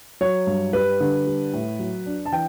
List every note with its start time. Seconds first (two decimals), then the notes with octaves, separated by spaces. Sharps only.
0.21 F#3 C#5
0.47 G2
0.73 G3 B4
1.00 D3
1.27 G3
1.53 A2
1.79 F#3
2.06 D4
2.26 A5
2.32 E3 G5